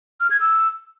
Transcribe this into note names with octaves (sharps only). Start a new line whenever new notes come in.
F6
G#6
E6